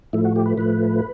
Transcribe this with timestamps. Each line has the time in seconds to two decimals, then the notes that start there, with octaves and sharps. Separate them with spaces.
0.13 A2 F3 A3 E4
0.25 F#4
0.36 G4
0.46 B4
0.58 A2 F3 A3 B4